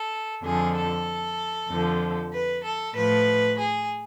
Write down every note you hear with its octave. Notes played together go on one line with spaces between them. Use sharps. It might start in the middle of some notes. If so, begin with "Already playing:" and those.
Already playing: A4
F2 D3 F3 G#4
A4
F2 D3 F3
B4
A4
A2 F3 B4
G#4